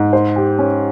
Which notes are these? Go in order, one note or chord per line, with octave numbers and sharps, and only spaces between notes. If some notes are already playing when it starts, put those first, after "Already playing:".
Already playing: G#2
C5
G4
C#4